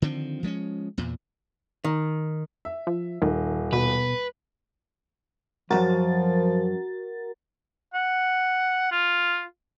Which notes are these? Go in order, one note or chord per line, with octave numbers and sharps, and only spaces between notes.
D3 D#3 F3 C4
F3 G#3 C4 C#4
E2 A#2
D#3
E5
F3
D#1 D#3
B2 B4
C2 F#2 F3 F#4 A#4 A6
F#5
F4